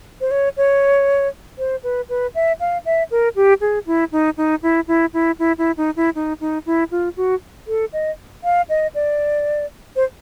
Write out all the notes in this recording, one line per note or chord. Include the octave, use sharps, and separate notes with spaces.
C5
C#5
C#5
C5
B4
B4
E5
F5
E5
A#4
G4
G#4
E4
D#4
D#4
E4
E4
E4
E4
E4
D#4
E4
D#4
D#4
E4
F4
F#4
A4
D#5
F5
D#5
D5
C5